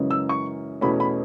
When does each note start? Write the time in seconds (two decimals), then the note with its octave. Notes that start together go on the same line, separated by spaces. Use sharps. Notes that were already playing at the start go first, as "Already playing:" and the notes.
Already playing: F#2 C#3 E3 G#3 C#4
0.11 E6
0.29 C#6
0.81 E2 B2 A3 C#4 B5
1.00 B5